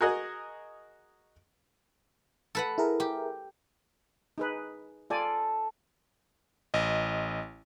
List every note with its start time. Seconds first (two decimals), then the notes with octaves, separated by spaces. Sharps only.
0.01 F#4 G#4 A#4 D#5 F#5 G#5
2.55 A4 B4 F#5
2.78 E4 G#4 A#4
3.00 G4
4.38 D#4 G#4 B4
5.10 F4 A4 D5 G#5
6.74 A1 D#5